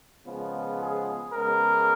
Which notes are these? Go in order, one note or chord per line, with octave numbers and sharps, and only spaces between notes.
C#3 F3 G#3 B3
G#4
C#3 G#3 B3 A#4